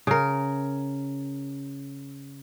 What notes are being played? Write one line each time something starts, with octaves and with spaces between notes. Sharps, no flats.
C#3 A#4